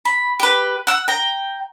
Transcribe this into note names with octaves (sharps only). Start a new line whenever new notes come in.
B5
G4 B4
F#5 E6
G5 A#5